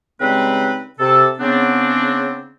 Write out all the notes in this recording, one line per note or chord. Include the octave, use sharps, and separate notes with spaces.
C#3 G3 G#3 C4 D#4 B4
C3 A4
C#3 B3 C4 D4